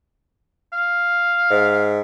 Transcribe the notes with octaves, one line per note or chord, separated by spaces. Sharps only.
F5
G#2